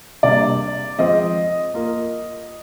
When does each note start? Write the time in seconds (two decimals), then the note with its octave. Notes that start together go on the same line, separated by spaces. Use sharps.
0.23 C3 G3 A#3 D4 D5
0.98 F3 G#3 C4 F4 C5 D#5
1.74 A#3 F4 A#4